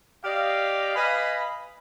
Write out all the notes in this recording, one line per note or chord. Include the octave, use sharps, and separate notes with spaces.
G4 D5 D#5 F5
B4 D#5 F5 G#5 B5